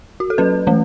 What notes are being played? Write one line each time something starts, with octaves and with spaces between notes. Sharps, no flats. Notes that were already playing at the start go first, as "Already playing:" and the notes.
F#4
A4
F#3 C#4 B4
E3 A3 C#4